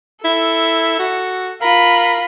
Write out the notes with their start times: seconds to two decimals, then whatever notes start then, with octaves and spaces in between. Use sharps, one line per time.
0.24 E4 A4
0.99 F#4
1.62 F4 A#4 B5